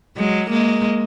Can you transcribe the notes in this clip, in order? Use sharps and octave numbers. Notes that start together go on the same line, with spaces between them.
F#3 G#3
G#3 A#3